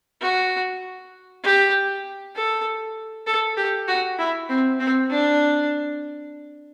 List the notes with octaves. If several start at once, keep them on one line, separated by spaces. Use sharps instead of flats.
F#4
G4
A4
A4
G4
F#4
E4
C4
C4
D4